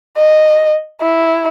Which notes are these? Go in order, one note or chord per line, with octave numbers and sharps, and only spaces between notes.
D#5
E4